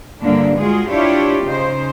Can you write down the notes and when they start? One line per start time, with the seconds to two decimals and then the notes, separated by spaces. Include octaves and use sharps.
0.21 G2 A#2 D3 A#3 D4
0.59 G#3 F4 F#4 G#4
0.90 D4 E4 F4 G4 C#5 D5
1.44 C#3 D#4 C5